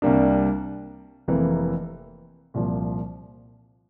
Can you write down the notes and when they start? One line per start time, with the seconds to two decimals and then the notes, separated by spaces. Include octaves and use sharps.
0.02 C2 C3 G3 A#3 D4
1.28 F1 F2 C3 E3 A#3
2.54 C2 A#2 F3